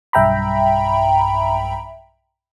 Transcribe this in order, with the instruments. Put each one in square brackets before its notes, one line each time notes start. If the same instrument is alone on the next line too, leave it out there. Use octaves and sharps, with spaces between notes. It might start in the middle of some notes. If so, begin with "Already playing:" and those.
[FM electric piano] B1 G2 E5 G5 A#5 B5